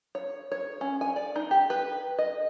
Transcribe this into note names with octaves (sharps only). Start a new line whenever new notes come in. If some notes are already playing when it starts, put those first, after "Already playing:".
C#5
C#5
C#4
G#5
D5
D#4
G4
B4
D#5